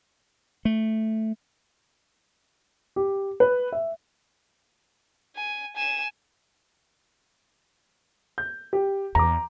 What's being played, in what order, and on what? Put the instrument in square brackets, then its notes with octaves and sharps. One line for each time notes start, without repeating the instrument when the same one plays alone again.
[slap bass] A3
[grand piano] G4
B4
E5
[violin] G#5
G#5 E7
[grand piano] G6
G4
[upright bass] E2 [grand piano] A#5 D6